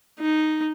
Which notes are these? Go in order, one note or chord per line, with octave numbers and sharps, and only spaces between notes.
D#4